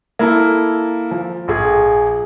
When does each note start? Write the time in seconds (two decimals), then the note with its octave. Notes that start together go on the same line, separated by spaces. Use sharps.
0.19 A#3 E4 A4
1.11 F3
1.48 A#1 G#4